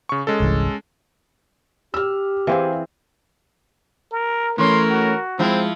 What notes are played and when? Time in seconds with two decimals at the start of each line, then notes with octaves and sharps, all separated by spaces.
0.09 C#3 C#6
0.27 G#3 C#4 A4
0.40 G1 C2 E3
1.94 G4 E6 F6
2.47 E3 C4 G#4 C5 F5
4.12 A#4
4.58 E3 A3 C#4 A#4 C6
4.90 F#4
5.39 F3 G#3 C4 E4